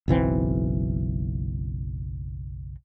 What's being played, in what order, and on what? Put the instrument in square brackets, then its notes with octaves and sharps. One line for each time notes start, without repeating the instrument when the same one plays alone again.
[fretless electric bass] F#1 B1 E3 C4